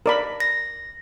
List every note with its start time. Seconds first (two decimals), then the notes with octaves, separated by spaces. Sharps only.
0.06 A#4 D5 B5
0.40 A#6